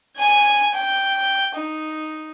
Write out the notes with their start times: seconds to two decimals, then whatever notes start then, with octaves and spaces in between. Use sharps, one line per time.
0.18 G#5 G#6
0.74 G5
1.55 D#4